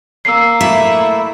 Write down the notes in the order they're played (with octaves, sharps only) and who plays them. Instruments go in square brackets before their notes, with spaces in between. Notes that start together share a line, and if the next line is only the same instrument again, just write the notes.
[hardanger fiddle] A#3 [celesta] E6 C7
[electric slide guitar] A3 E4 [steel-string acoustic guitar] E5